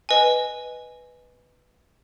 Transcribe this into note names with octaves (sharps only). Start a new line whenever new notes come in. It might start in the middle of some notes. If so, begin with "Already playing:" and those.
B4 D#5 G#5